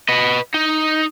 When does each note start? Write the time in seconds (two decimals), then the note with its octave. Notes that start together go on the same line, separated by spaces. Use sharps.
0.09 B4 D#5
0.54 D#4